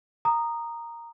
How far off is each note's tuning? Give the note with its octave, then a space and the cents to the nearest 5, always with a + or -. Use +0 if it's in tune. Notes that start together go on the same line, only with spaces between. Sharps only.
A#5 -5 D#6 -15